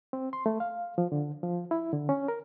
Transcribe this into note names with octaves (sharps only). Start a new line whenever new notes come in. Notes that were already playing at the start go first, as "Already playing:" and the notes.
C4
C6
A3
F5
F3
D3
F3
E4
D3
C#4
A#4